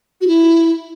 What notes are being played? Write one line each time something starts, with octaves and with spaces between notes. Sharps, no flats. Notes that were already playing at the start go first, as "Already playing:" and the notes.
F#4
E4